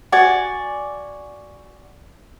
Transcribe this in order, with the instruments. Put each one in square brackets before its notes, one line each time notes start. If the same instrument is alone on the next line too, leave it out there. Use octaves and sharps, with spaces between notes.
[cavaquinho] F#4 D5 G#5